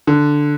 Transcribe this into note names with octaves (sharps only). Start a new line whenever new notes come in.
D3